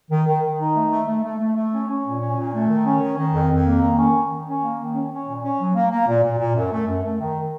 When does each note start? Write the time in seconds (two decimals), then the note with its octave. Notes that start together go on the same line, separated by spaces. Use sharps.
0.11 D#3
0.27 D#3
0.42 D#3
0.59 D#4
0.76 A3
0.91 A3
1.07 A3
1.23 A3
1.39 A3
1.56 A3
1.72 C#4
1.87 C#4
2.04 A#2
2.20 C#4
2.36 A#2
2.52 A3
2.68 D#3
2.84 C#4
3.01 D#3
3.17 D#3
3.33 F2
3.49 F2
3.65 A#3
3.81 D#3
3.96 C#4
4.13 D#3
4.29 D#3
4.45 C#4
4.61 A#3
4.77 D#3
4.94 C#4
5.10 C#4
5.26 A#2
5.43 C#4
5.58 F#3
5.75 A#3
5.90 A#3
6.06 A#2
6.23 A#2
6.38 A#2
6.55 F#2
6.71 A3
6.86 F#2
7.03 A3
7.20 D#3